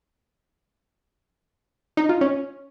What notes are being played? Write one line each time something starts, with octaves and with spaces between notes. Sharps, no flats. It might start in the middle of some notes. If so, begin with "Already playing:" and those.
D#4
F4
C#4